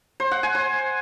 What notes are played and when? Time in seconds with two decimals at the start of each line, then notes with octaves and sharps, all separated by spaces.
0.20 C5
0.31 F#5
0.43 G#5
0.55 C5